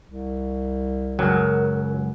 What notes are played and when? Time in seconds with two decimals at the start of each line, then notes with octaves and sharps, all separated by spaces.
0.05 C2
1.19 C#2 F#2 F#3 A#4